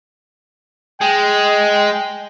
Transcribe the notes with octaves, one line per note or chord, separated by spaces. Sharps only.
G#3 G5